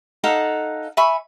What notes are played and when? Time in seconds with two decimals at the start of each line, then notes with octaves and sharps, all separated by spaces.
0.24 D#4 A4 F5 F#5
0.97 E5 G#5 B5 C#6